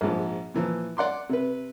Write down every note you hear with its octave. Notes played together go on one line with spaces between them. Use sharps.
A#1 G#2 F3
A#2 E3 F3
D5 F#5 C6 D6
C3 B4